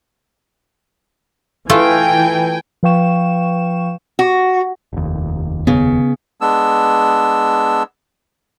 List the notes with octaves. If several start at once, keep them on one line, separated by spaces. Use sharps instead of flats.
E3 A3 F4 G5 G#5
F3 B4 F5 G5 C#6 E7
F#4
F1 D#2
C#3 B3
G#3 B3 D4 E6